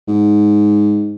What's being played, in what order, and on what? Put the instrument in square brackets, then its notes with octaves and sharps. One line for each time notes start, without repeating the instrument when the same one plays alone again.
[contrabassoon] G#2